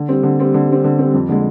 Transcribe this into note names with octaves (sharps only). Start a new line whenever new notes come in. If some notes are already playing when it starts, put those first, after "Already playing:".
Already playing: D3
G3 C4
D3
G3 C4
D3
G3 C4
D3
G3 C4
F2
D3 G#3